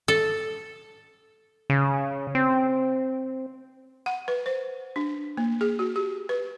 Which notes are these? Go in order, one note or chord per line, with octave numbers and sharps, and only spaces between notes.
A4
C#3
C4
F#5
B4
C5
D4
A#3
G#4
F#4
G4
B4